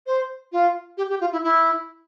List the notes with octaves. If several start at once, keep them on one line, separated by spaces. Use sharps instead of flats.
C5
F4
G4
G4
F4
E4
E4